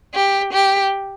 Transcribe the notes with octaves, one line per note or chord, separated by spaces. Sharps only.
G4
G4